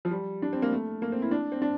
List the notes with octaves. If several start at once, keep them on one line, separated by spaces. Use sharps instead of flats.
F3
G3
D4
C4
A#3
A3
A#3
C4
E4
D4
C4
D4